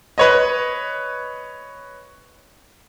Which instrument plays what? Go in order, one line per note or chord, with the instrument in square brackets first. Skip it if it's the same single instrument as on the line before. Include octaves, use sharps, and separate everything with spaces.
[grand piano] B4 C#5 D#5